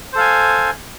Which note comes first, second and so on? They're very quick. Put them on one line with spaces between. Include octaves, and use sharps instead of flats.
C5 A4 F5 G#5